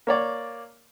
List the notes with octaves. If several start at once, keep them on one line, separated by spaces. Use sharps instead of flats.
A#3 C#5 D5